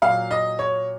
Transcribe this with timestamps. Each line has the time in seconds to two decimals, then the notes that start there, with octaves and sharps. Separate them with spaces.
0.02 A#2 F#3 F5
0.31 D#5
0.59 C#5